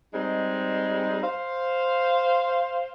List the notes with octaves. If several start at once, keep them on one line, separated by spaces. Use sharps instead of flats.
G3 G#3 C4 D#4
C5 F5